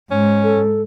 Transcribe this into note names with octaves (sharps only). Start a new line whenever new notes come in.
G#2 C#4
A4